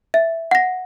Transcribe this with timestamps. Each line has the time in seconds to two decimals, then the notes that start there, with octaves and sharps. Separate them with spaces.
0.14 E5
0.51 F#5 A#6